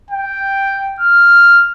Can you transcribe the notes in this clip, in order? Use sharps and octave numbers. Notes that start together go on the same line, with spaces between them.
G5
F6